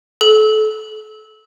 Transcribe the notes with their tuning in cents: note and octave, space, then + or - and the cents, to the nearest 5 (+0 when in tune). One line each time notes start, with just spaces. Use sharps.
A4 -35